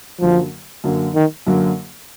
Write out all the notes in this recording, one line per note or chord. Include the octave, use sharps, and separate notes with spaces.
F#2 D3 F3 F#3 A#3
F#2 D3 F#3 A#3
D#3
F#2 D3 F#3 A#3